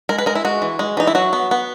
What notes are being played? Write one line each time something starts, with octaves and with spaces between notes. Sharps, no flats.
G#3 A#4
B4
G#3 A#4
E4
G#3 F#4
E3
G#3
E3 D#4
E4
F#3 F#4
B3
B3